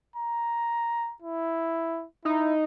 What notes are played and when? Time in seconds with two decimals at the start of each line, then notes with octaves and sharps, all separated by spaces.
0.16 A#5
1.22 E4
2.25 D#4 E4